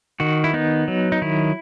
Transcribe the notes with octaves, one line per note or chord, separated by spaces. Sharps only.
D#3 F#4
E4
B3 D#4
F#3
D#4
D#3 E4